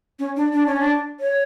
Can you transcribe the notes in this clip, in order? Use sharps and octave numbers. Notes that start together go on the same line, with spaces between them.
C#4
D4
D4
C#4
D4
C#5